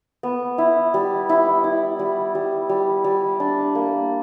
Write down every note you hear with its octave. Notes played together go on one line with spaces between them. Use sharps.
B3
E4
G3
E4
E4
G3
G3
G3
G3
D4
A#3